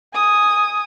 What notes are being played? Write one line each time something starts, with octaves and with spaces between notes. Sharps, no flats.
G#5 D#6